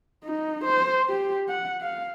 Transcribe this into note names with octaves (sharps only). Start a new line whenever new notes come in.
D#4
C5
G4
F#5
F5